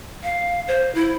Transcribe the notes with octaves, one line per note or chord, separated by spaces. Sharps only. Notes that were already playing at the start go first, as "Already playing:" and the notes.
F5
C5
E4